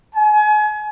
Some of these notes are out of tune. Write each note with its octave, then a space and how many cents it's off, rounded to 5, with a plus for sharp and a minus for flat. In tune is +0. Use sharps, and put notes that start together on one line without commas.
G#5 +35